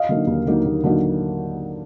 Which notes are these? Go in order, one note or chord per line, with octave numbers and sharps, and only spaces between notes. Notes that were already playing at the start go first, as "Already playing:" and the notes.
Already playing: D#5 F5
D3 F#3 A#3 D#4
D#2
D3 F#3 A#3 D#4
D#2
D3 F#3 A#3 D#4